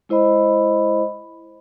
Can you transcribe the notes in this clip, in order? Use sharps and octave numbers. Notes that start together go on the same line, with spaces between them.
G#3 E4 C5 D#5 B5